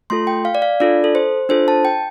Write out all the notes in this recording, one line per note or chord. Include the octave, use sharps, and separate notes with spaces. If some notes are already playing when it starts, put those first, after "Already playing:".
A3 F4 A4 C6
G5
F5
D5
F5
D4 F4 A4 D5
A4
C5
D4 F4 A4 C5
A5
G5